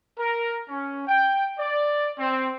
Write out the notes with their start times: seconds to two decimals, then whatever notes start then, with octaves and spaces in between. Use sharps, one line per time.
0.18 A#4
0.69 C#4
1.08 G5
1.59 D5
2.19 C4